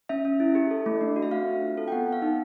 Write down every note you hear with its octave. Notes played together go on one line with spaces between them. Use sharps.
C#4 E5
C#4
E4
G4
A4
A3
D4
F#4
E5
C4 F5
C4
F4
A4
G5
B3 F#5
B3 F5
D#4